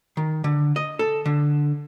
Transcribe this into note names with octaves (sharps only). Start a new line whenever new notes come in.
D#3
D3
D#5
A4
D3